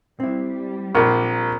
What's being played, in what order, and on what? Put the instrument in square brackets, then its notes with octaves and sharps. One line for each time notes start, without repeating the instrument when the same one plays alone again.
[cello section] G3 [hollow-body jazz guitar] C4 E4
[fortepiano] A#1 [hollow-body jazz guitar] A#3 C4 F4